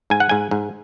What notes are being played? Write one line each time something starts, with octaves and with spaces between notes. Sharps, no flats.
G#2 G#5
F#5
G#2 G#5
G#2